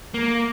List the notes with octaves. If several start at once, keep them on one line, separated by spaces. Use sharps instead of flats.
A#3